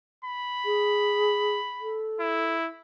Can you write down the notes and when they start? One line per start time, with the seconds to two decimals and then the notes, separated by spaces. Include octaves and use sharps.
0.25 B5
0.65 G#4
1.80 A4
2.20 E4